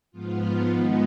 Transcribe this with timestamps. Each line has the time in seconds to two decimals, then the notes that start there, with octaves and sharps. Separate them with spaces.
0.11 G#2 F3 B3 F4
0.68 G#2 D#3 G#3 B3 D#4